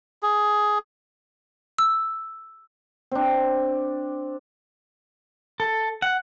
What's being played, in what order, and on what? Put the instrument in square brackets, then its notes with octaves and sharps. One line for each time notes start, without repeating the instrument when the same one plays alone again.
[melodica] G#4
[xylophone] E6
[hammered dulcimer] C4 D4
[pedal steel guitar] A4
F#5